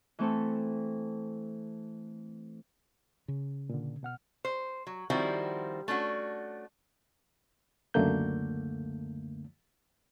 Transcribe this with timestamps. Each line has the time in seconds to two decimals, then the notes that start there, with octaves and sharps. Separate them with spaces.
0.19 E3 A3 C4 A4
3.28 C#3
3.69 A#2 D3
4.03 B2 F#5 F6
4.45 C5
4.87 F#3
5.10 D#3 F3 G3 C4 E4 F#4
5.88 A3 C#4 D4 F#4
7.94 C#2 F#2 D3 A3 A#3 G6